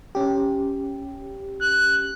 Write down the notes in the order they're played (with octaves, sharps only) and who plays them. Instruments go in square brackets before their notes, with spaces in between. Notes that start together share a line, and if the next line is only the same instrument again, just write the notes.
[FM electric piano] C#4 G4
[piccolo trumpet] F#6